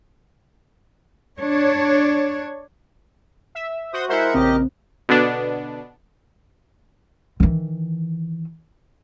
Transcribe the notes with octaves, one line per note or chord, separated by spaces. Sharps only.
D4 C#5
E5
F#4 C5 D#6
G#3 E4 A#4 C5 E5 F#5
A#1 C#3 C4 G4 D#5
B2 D3 B3 D4
D#3 E3